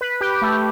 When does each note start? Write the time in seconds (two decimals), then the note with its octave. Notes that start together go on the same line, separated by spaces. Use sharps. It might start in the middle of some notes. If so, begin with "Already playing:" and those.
0.01 B4
0.21 G4
0.42 A3